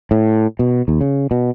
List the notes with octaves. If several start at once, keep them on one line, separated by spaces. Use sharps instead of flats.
A2
B2
D#2
C#3
B2